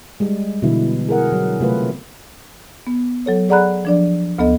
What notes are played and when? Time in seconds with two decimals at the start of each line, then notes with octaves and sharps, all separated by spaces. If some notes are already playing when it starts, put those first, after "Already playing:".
0.20 G3 G#3
0.62 B2 D3 E3 E4
1.09 G#4 A#4 F#5
1.32 F#3
1.60 C3 A3 F4 B4
2.87 B3
3.26 F#3 A4 C#5
3.49 G#4 D5 F#5 A#5 B5 F#6
3.85 F3 D4 D5
4.39 D2 B3 A4 D#5